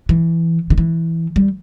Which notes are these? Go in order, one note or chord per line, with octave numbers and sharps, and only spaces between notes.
E3
D3
E3
G3